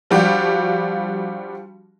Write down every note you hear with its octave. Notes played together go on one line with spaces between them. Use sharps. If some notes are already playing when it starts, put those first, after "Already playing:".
F3 G3 D4 F#4 G4 F5